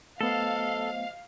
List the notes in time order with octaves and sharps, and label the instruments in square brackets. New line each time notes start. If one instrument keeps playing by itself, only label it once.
[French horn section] F#3 C5 D#5 [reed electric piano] A3 B3 [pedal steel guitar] A4 [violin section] F5